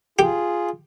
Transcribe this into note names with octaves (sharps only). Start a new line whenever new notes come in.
F4 G4 G#4